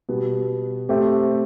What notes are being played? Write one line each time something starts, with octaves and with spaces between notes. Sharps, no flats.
B2 G3 B3
A3 C4 G4